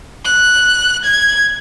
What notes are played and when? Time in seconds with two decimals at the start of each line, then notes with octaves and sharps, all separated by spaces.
0.25 F#6
1.05 G#6